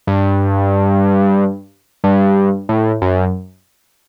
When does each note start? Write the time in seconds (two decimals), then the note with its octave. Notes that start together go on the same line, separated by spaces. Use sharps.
0.07 G2
2.04 G2
2.69 A2
3.02 F#2